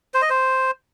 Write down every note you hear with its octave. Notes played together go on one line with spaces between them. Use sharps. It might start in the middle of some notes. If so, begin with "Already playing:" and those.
C5
D#5
C5